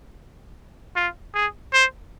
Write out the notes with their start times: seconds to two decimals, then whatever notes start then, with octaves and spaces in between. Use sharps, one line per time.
0.96 F4
1.34 G#4
1.73 C5